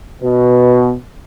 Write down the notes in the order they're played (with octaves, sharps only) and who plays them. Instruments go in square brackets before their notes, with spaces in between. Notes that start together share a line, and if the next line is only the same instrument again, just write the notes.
[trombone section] B2